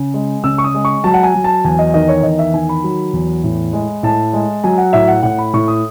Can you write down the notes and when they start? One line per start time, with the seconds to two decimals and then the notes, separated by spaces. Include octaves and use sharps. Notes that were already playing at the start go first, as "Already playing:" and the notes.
Already playing: C#3
0.14 G#3
0.44 C#3 E6
0.58 C#6
0.64 D#6
0.74 G#3
0.84 C#6
1.04 F#3 A5
1.14 F#5
1.23 G#5
1.34 F#3
1.44 A5
1.64 E2 G#5
1.79 D#5
1.94 D#3 D#5
2.08 C#5
2.23 E2 D#5
2.39 E5
2.53 D#3 G#5
2.69 B5
2.84 F#3
3.13 E2
3.44 A2
3.73 G#3
4.03 A2 A5
4.33 G#3
4.64 F#3 G#5
4.78 F#5
4.93 A2 E5
5.08 F#5
5.23 A2 F#5
5.38 B5
5.54 A2 C#6
5.68 D#6